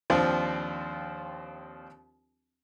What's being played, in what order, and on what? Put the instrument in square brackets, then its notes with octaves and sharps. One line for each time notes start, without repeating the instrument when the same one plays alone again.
[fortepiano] D#2 F3 C4 D4 F4